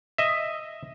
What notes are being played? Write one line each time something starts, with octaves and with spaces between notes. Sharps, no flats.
D#5 E5